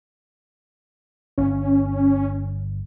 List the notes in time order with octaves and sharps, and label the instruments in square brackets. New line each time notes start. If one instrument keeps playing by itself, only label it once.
[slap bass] G1 [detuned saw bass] C#4